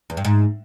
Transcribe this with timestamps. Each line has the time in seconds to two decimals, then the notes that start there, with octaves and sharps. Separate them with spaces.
0.10 E2
0.17 G2
0.25 G#2